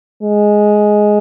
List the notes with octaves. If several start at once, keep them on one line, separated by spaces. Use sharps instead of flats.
G#3